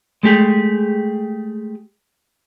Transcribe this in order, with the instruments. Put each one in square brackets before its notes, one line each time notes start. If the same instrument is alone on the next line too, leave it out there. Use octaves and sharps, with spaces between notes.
[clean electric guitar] G#3 A3 G4 G#4